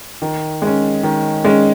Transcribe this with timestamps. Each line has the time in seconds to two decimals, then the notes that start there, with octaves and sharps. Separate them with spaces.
0.22 D#3
0.62 G#3 C#4
1.03 D#3
1.45 G#3 C#4